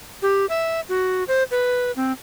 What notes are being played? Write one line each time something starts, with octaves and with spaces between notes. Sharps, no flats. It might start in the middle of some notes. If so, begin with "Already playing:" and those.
G4
E5
F#4
C5
B4
C4